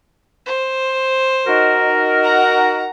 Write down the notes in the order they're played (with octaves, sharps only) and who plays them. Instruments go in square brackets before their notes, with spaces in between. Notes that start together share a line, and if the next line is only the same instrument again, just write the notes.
[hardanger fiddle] C5
[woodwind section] D#4 F#4 A#4
[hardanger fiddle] F#5 A#5